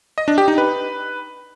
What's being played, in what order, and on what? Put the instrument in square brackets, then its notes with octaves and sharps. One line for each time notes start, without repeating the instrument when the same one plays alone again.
[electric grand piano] D#5
D4
G4
D#4
B4